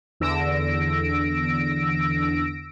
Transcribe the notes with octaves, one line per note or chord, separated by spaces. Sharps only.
E2 D3 E6 A#6 D7